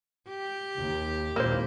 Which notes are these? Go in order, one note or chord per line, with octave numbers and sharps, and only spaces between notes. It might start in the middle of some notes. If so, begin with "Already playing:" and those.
G4
D#2
G#1 D#2 A#2 A#3 E4 C5